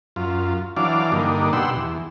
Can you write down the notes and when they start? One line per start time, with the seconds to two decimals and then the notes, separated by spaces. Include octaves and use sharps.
0.16 F#2 F4
0.77 E3 F#3 D4 D5 F5
1.12 G2 D3 A#3 D4 D#4
1.53 B2 G4 F#5 C6 E6
1.76 E2